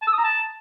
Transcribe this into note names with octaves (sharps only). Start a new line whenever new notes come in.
A5
E6
D#6
A#5
A5